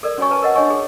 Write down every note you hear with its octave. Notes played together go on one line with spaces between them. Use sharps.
A4 A#4 D5
C#4 F#4 C#5 G#5 C#6
B4 G#5 A5
A#4 D#5 F#5
D4 C#5 D#5 G#5 C#6
G#4